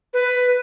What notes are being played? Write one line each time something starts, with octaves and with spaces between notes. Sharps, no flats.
B4